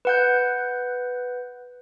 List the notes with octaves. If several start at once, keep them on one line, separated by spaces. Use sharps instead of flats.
B4 F#5 G6